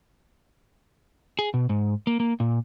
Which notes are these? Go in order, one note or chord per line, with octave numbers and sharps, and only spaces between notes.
G#4
B2
G#2
A#3
A#3
A#2